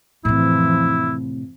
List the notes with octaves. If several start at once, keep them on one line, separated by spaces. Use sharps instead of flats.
F2 A2 C3 E3 F3 E4